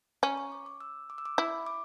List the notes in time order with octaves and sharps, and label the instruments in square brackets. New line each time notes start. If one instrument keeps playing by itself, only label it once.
[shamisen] C#4 [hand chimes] A#5
[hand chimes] C#6
D6
D6
E6
D6
E6
D6
[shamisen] E4 [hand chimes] B5
[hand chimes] D6